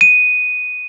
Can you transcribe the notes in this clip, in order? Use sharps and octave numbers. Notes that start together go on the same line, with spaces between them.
D#7